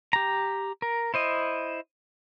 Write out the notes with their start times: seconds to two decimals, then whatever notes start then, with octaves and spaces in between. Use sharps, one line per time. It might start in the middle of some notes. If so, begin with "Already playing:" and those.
0.13 G4 A#5
0.82 A#4
1.14 E4 C5 D#5